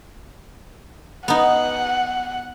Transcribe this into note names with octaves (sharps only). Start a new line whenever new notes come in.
B3 D#4 F#5